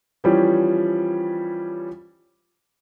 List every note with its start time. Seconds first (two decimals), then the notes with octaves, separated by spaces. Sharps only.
0.24 E3 F3 G3 C#4